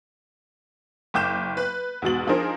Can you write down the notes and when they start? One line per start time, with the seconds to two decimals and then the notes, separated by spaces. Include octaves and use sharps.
1.14 F#1 G5 D6 G6 E7
1.57 B4
2.02 E2 G#2 B2 A6 F#7
2.27 F3 D4 D#4 G#4 A#4 C5